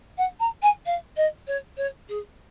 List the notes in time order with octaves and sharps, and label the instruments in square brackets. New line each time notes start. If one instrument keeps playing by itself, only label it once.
[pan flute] F#5
A#5
G#5
F5
D#5
C#5
C#5
G#4